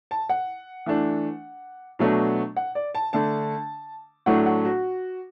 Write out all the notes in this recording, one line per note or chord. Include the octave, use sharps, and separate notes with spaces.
A5
F#5
E3 A3 D4
B2 F#3 A3 D4
F#5
D5
A5
D3 A3 D4 A5
A2 F#3 A3 D4 F#5
F#5
F#4